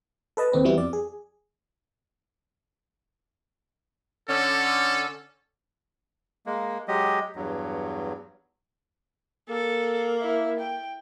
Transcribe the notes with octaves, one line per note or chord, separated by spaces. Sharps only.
A4 B4 D#5 A5
D#2 C4 B4
E3 G3 B3 E4 F#4
F2 D5
G#4
D3 C#4 A4
G#3 A#3
F#3 G#3 G4 D#5
E2 G2 F#3
A#3 A4
E4
G5